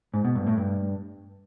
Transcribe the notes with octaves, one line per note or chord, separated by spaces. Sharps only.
G#2
B2
G2
A2
G2